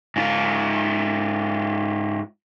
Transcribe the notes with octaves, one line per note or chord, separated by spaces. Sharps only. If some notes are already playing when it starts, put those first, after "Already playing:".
G#2 F4